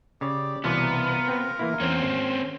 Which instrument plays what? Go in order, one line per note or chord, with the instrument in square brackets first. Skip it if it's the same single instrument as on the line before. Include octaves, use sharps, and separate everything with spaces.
[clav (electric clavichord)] C#3 C#5 [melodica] G4 D5
[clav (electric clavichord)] C2 B2 E3 [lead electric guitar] B3 [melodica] F4 A#4 A#5
[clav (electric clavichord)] C4 B4
E3 A#3 E4
[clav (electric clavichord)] E2 [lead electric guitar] C4 C#4
[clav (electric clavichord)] G#1 [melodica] C6